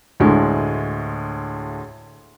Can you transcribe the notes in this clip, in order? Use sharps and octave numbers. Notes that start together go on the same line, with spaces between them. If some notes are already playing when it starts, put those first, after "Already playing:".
D2 A2 G#3